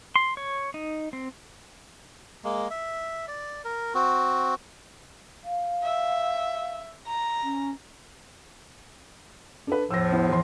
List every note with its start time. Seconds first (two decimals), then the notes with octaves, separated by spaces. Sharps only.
0.16 C6
0.37 C#5
0.74 D#4
1.13 C4
2.44 G#3 A#3
2.70 E5
3.28 D5
3.64 A#4
3.94 C4 F#4
5.44 F5
5.83 E5
7.07 A#5
7.43 C#4
9.67 D4 A4 B4
9.91 E2 A2 F3 E6 A#6
10.12 B3 E4
10.29 E3 C6